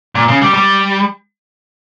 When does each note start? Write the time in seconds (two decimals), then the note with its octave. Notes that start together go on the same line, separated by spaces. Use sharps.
0.15 A#2
0.28 C#3
0.42 G3
0.54 G3